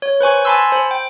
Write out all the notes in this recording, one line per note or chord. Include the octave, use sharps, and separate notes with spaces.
C#5
B4 C5 G#5 C#6
G#5 A5 B5 C6 E6
C5
G5